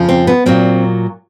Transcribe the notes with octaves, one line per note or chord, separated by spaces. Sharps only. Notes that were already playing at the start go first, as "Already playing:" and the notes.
Already playing: F2 C#3 F3
C4
B3
A#2 F#3 A#3 C4